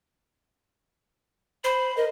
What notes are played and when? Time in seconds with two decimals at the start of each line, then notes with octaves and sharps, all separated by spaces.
1.64 C5 B5
1.97 A#4 D#5